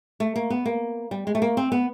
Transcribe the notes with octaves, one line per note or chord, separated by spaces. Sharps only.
A3
A#3
B3
A#3
G3
G#3
A3
A#3
C4
B3